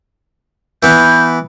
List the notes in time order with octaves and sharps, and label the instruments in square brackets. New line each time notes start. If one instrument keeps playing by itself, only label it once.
[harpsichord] E3 B3 [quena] G6